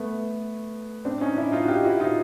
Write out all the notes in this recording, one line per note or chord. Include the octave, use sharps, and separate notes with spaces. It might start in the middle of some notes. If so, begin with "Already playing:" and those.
Already playing: A3 B3
C4 D4
C#4 D#4
D4 E4
D#4 F4
F#4
F4 G4
E4 F#4
D#4 F4